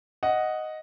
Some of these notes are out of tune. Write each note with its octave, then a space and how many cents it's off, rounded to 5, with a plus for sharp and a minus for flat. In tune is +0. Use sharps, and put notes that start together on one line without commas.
D#5 +0 F#5 +0